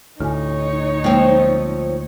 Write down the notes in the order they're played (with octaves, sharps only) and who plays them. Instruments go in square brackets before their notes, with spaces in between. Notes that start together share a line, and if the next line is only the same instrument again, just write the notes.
[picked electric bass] D2 A2 [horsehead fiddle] D#4 C#5 [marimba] G#5 F6
[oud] F3 C4 [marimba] G#3 A#3 G5